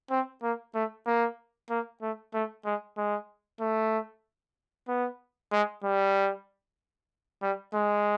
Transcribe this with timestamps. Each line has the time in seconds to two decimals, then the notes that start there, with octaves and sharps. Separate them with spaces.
0.11 C4
0.43 A#3
0.75 A3
1.07 A#3
1.70 A#3
2.02 A3
2.34 A3
2.65 G#3
2.97 G#3
3.60 A3
4.88 B3
5.52 G#3
5.83 G3
7.42 G3
7.74 G#3